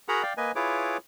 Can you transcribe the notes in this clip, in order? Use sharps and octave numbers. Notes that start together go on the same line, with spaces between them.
F#4 G#4 A#4 F#5 A#5 B5
D5 F5 G5
A#3 B4 D#5 G#5
E4 F4 G#4 B4 C#5 D6